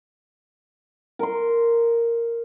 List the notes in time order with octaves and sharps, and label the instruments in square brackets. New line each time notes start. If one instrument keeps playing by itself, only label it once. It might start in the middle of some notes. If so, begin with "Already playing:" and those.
[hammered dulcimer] A#4 C6